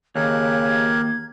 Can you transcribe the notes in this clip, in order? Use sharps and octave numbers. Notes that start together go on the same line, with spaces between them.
D#2 C#3 G4 A#4 F#6 G#6